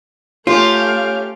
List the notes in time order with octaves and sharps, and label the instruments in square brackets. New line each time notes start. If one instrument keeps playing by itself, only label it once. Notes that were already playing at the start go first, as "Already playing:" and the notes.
[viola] A3 F5 [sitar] C#4 G4 [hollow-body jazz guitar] F4